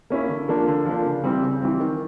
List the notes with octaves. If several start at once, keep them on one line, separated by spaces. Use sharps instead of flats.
A#3 C#4 E4
D3
F3 A#3 D4
D3
F3 A#3 D4
C#3
E3 G3 C4
C#3
E3 G3 C4
D#3